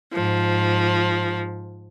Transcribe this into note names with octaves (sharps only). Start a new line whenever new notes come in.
G#2 F3